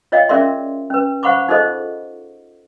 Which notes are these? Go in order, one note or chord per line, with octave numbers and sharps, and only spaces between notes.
F4 C#5 D#5 F5 G5
C#4 G#4 A#4 D5 E5 C6
C#4 B4
C5 F5 F#5 B5 C#6 D6
D#4 F4 G#4 A4 C5 D#5